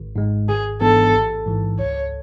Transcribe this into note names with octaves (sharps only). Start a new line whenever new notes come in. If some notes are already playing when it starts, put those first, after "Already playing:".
Already playing: G#1
G#2 G#3
G#1 G#4
G#2 E3 B3 D4 A4
A1
G#2 E3
C#2 C#5